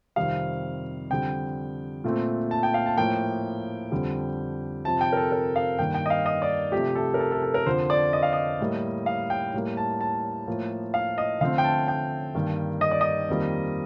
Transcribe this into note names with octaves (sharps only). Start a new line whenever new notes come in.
F2 C3 D#3 G3 F5
F2 D3 G3 G5
A#2 A3 C4
A5
G5
F5
A5
A2 F3 A#3 G5
F2 D3 G3
F2 C3 F3 A5
G5
A#4
A4
A#4
F5
G2 D#3 A#3 G5
G5
D#5
F5
D#5
D5
C3 F3 A3 G4
A4
A#4
A4
A4
A4
A#4
F2 D3 F3 C5
D5
D#5
F5
D#5
A2 G3 A#3
F5
G5
A2 G3 A#3
A5
A5
A2 F3 A#3
F5
D#5
D3 F3 A3 C4 F5
G5
A5
G5
G2 D#3 A#3
D#5
D5
D#5
F2 D#3 G3 A#3